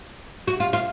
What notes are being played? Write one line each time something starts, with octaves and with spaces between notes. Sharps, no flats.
F#4
F4
F4